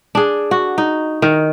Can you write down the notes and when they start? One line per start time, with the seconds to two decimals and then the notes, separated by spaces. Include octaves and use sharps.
0.15 D4 G#4
0.51 F#4
0.78 D#4
1.22 D#3